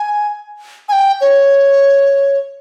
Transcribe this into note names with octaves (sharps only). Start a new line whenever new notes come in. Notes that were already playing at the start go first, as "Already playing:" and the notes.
Already playing: G#5
G#5
G5
C#5